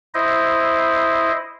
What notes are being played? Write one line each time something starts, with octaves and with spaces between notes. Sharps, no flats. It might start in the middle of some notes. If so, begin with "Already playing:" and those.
E4 C5 D#5